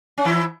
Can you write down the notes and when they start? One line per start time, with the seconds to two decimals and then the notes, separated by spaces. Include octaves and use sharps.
0.18 C#4
0.25 E3 E4